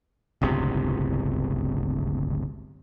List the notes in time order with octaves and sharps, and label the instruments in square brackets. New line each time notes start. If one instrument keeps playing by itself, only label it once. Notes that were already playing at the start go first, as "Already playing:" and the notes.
[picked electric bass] D1 G1 C#2 C3